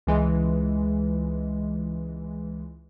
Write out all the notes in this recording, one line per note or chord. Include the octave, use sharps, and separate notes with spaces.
C#2 E3 G#3